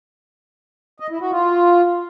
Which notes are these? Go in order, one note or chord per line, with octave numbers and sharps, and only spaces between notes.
D#5
E4
F#4
F4